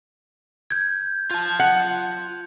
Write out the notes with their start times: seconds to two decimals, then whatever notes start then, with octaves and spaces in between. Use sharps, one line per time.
0.70 G6 G#6
1.31 F4 A5 G6
1.60 F#5